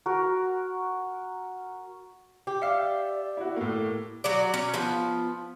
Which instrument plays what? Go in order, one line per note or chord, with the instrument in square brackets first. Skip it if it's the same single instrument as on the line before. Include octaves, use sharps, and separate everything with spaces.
[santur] F#4 A#4
[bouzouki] G4
[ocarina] D5 [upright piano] E5 [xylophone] F5 F6 C#7
[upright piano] E4 F#4
A2 A#3
[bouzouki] F#3 F#4 D5
C#4
F3 B3